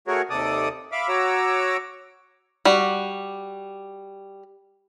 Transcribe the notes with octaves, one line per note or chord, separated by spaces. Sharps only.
A3 F#4 G#4 A#4 C#5
D#2 C3 A4 D5 D#6
E5 F5 B5 D6
F#4 C#5 A#5 D6 E6
G3 F#4